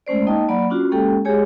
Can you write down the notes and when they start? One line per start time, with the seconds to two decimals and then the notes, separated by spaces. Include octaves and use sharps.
0.07 G#3 A3 C#4 C5 D5
0.27 A#3 D#4 D#5 G5 A5
0.48 F#3 A#3 D5 F#5 B5
0.70 C#4 D4 F4 F#4
0.91 G#3 A#3 C#4 G4 A4 G5
1.25 G#3 G4 G#4 C#5 G#5